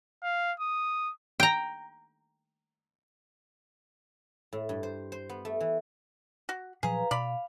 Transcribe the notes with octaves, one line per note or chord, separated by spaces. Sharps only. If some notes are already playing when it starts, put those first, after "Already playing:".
F5
D#6
G5 A#5
A2
G2
C5
C5
B3
A3
E3
F#4
A#2 F3 F#3 G#4 B4 F5 A#5
B2 D5 F5 B5